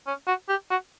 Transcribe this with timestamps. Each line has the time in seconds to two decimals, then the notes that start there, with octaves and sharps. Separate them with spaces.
0.07 C#4
0.27 F#4
0.49 G4
0.70 F#4